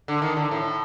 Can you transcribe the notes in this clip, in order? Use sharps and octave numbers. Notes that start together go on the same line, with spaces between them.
D3
D#3
D3
A2